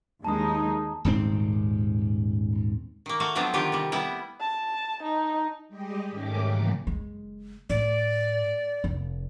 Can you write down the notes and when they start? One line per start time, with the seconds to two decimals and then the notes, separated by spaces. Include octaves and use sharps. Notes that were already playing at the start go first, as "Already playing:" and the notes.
0.24 D#2 G#3 D#4 A5 A#5 D#6
1.05 D#1 G#2 C4
3.06 D#3 A#3
3.20 A3 F#4 F5
3.35 F3 F#3 B3 C4 D4
3.54 D3 D#3 F4 G4 G5
3.72 C3 G3
3.92 G3 B3 E4
4.41 A5
5.03 D#4
5.68 G3 G#3 G4 D#5
6.09 G#2 D#3 A3 C#4 G4 D6
6.40 G#2 C#3 E3 F#3 A#3
6.87 F#1 G#3
7.70 A2 D5
8.84 F1